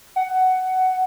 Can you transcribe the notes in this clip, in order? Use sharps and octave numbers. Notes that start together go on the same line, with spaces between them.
F#5